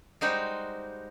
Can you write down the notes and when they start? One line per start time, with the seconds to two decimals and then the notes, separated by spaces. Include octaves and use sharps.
0.21 G3 G#3 D#4 F#4 C5 G5